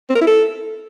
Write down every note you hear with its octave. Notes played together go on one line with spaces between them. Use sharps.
C4
A#4
E4
A4